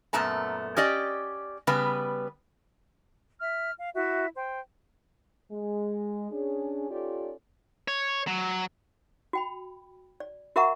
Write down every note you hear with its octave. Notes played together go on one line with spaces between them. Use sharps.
F#2 A#2 A3 B3 A5 A#5
C#4 G4 D5 D#5
C#3 G3 B3 B4
E5 F6
F5
E4 F#4 E5
C5 G5
G#3
C#4 D4 G#4
C#4 D#4 F4 G4 A4 D5
C#5
F#3
F#4 G5 B5
D5
F#4 A#4 E5 F#5 A#5 C#6